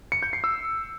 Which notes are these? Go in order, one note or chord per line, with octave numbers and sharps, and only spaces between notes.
C#7
G6
C7
E6